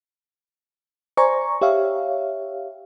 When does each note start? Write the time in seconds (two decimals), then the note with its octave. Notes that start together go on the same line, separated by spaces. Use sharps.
1.17 C5 D5 G#5 A#5 C#6
1.61 G4 C#5 E5 F5